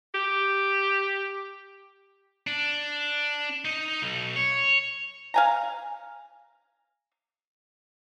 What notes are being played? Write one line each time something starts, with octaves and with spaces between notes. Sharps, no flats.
G4
D4
D#4
B1
C#5
F5 G#5 A#5